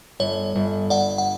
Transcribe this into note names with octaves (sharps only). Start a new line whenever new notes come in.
G1 C#5
G1
G2 D5 F#5
F#5